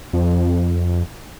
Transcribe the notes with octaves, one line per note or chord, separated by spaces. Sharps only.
F2